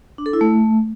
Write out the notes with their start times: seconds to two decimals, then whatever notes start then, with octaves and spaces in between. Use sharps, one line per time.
0.18 D4
0.26 A4
0.33 E4
0.41 A3